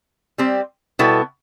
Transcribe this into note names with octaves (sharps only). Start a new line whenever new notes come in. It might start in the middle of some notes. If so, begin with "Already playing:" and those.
G3 C4 G4
B2 G3 B3 E4 A4